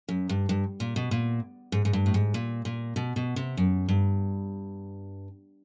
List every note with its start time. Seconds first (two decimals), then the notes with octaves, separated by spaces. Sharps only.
0.09 F#2
0.29 G2
0.49 G2
0.80 A#2
0.96 B2
1.11 A#2
1.72 G#2
1.85 G#2
1.93 G2
2.06 A2
2.14 G#2
2.34 A#2
2.65 A#2
2.96 B2
3.16 B2
3.36 C3
3.57 F#2
3.89 G2